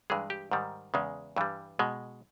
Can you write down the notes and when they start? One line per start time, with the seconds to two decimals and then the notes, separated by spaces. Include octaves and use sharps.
0.10 G2 E3 G#3 G#4
0.30 G4
0.52 G#2 D#3 G3
0.94 E2 C#3 G#3
1.36 G2 E3 G3
1.79 B2 G#3